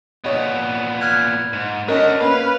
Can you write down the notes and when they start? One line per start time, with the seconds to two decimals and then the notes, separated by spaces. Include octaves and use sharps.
0.24 A#2 B3 C#5 D#5
1.01 F6 F#6 G#6
1.53 G#2
1.88 C#4 D4 F#4 A#4 D#5
2.21 A#3 C#4 B4 F5